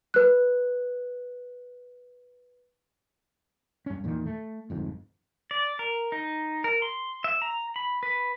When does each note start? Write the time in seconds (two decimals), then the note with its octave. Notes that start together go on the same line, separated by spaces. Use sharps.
0.14 B4 F#6
3.86 G2 C#4
4.04 E2 A#2 D#3
4.26 A3
4.70 G1 F2 G#2
5.51 D5
5.79 A#4
6.12 D#4
6.64 A#4
6.82 C6
7.24 E5
7.42 A#5
7.76 B5
8.03 B4